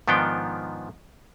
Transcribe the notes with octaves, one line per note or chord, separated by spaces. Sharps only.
G#2 D#3 F3 B3 D4 G5